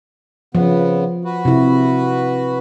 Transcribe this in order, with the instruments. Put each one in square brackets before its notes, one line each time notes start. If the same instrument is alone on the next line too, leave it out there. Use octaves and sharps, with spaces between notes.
[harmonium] C#3 B3 [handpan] F3
[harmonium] F#4 B4
[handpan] C3 E4